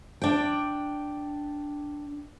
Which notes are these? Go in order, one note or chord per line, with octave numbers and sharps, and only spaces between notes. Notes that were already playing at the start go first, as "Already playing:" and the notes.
D4 G5